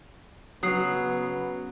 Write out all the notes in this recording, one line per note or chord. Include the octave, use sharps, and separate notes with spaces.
C#3 F#3 B3 D#6 C7